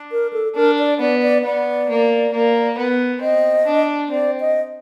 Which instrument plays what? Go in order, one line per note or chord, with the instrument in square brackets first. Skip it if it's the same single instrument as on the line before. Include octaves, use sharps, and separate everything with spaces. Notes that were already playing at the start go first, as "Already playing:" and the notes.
Already playing: [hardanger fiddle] D4
[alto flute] A#4
A4
[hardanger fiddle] D4 [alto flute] A#4
[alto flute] D5
[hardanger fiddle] B3 [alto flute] D5
[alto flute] D5
[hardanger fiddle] B3 [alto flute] D5
[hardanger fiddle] A#3
A#3
B3
[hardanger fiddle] C4 [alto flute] D#5
[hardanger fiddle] D4
[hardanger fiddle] C4 [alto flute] D5
[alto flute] D#5